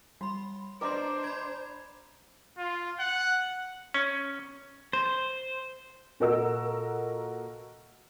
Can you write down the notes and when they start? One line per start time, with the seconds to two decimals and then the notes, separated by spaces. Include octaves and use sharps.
0.21 G3 B5 C6
0.81 D4 B4 C5 D5 D#5 A#5 C6 E6
1.24 B5 G#6
2.58 F4
2.99 F#5
3.94 C#4
4.93 C5
6.20 A#2 F#4 A4 A#4 D#5 E6